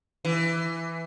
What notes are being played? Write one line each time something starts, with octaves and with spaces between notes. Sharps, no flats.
E3